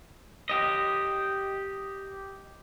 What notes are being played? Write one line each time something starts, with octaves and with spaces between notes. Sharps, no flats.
G4 D#5